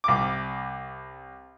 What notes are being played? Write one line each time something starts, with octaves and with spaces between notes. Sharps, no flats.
C2 D6